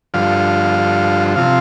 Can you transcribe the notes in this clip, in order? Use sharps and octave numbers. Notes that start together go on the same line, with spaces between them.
G2 D3 F3 F5
C3 F3 F5